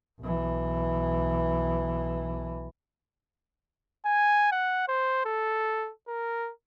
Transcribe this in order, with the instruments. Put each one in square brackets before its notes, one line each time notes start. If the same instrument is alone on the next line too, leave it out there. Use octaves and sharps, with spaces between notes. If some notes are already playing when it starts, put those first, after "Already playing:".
[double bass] B1 E3
[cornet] G#5
F#5
C5
A4
A#4